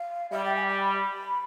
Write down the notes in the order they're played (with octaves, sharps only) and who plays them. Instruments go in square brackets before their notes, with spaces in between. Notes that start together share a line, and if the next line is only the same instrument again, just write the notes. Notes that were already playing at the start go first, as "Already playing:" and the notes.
Already playing: [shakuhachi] F5
[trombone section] G3 [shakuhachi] E5
[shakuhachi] G5
G#5
B5